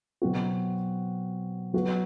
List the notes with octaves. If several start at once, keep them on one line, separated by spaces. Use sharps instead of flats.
B2 F#3 C4 F#4
F#3 B3 F#4